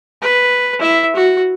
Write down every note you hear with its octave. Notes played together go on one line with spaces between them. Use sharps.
B4
E4 E5
F#4